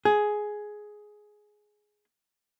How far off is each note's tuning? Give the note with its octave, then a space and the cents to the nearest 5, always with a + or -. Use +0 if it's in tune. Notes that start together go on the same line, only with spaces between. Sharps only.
G#4 +10